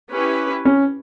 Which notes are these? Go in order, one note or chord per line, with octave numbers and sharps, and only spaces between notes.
C#4 E4 G4 B4
C#4